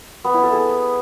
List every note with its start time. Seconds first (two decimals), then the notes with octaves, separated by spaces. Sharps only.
0.24 B3
0.34 E4
0.43 A4
0.53 G#4